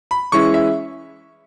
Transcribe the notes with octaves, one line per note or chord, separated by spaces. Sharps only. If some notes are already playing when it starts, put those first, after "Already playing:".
B5
E3 G#3 C#4 E4 C#6
E5